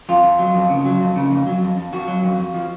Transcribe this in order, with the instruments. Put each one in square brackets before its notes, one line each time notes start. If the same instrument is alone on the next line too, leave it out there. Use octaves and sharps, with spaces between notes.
[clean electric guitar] F2 F4
F2
F#3
F2
C#3
F#3
F2
C#3
F2
F#3
F2
F2
F2 F#4
F#3
F2
F2
F3